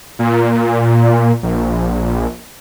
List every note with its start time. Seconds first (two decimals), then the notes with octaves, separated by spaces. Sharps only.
0.19 A#2
1.43 A#1